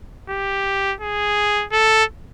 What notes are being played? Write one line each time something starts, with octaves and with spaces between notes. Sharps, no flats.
G4
G#4
A4